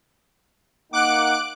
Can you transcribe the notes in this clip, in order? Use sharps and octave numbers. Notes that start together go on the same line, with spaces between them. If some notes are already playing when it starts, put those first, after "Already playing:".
A#3 D#4 F#5 D6 F#6 D7